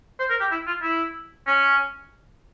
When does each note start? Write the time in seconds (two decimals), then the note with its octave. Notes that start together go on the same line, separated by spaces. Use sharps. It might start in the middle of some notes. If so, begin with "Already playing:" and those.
0.19 C5
0.29 A#4
0.40 G4
0.51 E4
0.67 F4
0.83 E4
1.47 C#4